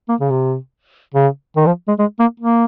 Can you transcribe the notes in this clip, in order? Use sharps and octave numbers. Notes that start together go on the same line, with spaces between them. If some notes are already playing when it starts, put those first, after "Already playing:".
A#3
C#3
C3
C#3
D#3
F3
G#3
G#3
A#3
A#3